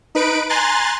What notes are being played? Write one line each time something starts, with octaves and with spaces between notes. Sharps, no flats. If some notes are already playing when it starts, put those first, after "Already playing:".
D#4 B4 D7
G#5 A#5 C6 F#6 A6